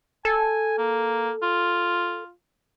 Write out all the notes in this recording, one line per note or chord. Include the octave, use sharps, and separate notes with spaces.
A4 G#5
A#3
F4